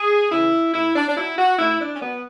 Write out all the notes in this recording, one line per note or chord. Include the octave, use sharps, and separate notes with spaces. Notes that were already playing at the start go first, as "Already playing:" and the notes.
Already playing: G#4
C#3 E3 E4
A2 E4
D4
D4
F#3 E4
F#4
A2 E4
D4
C#4
F#3 B3